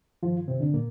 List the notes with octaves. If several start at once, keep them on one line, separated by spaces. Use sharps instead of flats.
G2 D#3 F3 F4
C3 C4
D3 D4
A#2 A#3